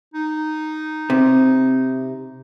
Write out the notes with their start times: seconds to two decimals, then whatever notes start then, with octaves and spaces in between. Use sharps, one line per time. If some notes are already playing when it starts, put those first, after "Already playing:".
0.14 D#4
1.10 C3